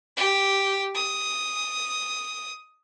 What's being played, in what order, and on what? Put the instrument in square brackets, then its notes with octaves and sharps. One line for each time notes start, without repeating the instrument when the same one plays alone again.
[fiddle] G4
D#6